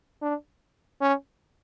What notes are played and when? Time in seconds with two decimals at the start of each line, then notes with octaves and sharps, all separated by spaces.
0.22 D4
1.01 C#4